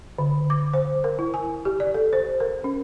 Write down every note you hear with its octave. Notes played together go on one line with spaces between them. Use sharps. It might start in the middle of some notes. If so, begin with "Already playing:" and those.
D3
D6
C5
A#4
E4
G#5
G4
D5
A4
C5
A#4
C#4